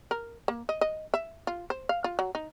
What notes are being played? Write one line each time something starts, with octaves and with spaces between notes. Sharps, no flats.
A#4
A#3
D#5
D#5
E5
F4
C5
F5
F4
F#3
D#4